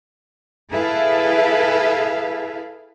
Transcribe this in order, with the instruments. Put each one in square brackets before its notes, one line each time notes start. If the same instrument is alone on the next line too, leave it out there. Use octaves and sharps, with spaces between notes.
[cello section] E4 G#4 A4 B4 E5 F5